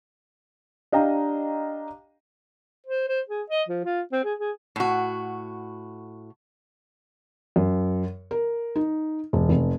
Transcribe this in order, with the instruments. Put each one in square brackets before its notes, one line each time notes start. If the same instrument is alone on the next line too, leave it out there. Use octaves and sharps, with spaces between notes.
[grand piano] D4 G4 D#5 F5 G5 A#5
[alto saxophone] C5
C5
G#4
D#5
F3
F4
C4
G#4
G#4
[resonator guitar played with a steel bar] A2 F#4
[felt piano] F#2
A#4
D#4
E1
F1